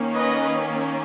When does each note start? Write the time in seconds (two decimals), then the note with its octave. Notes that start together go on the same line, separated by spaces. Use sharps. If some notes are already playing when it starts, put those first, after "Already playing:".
Already playing: D#3 A#3 C#4
0.14 B4 D#5